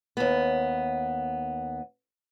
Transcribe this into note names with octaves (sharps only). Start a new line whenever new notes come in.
D#2 B3